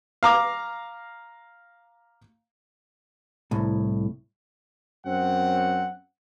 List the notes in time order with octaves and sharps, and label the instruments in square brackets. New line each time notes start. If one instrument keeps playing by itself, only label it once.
[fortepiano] F5 A#5 D6
[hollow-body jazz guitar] C2 A2
[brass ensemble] F#2 C4 F#5